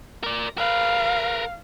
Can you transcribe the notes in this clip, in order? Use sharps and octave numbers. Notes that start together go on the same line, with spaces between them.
A#4 D5
A#4 B4 F5